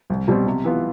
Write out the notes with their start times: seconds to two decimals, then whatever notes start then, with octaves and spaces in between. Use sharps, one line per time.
0.10 C2
0.28 B2 G3 C4
0.47 C3
0.64 E3 B3 F4